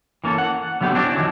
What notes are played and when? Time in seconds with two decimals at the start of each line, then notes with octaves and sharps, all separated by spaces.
0.24 E3 A#3 C#4 A4
0.38 F#5
0.81 D3 F#3 A3 B3 G4
0.95 C#4 D4 E4 F#4 C5 D5
1.16 D#3 F3 F#3